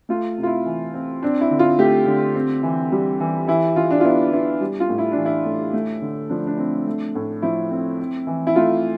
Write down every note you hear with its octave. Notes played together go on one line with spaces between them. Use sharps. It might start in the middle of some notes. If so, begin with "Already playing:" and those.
A3 F4
C3
F4
E4
E3
C4
C4 D4
E4
D3
F4
A3 G4
D3
C4
E3
G3
E3
E3 E4
E3 F4
D4
F4
B3 E4
B3 E4
G3
F4
A2
E4
E3 D4
E4
A2
A3
D3
F3 D4
D4
C4
A3
A2
F3 E4
C4
C4
E3
E4
A3 F4